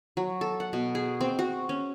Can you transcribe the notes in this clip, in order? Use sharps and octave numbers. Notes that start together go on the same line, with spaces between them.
F#3
A4
F#5
B2
G#4
C4
F#4
C#4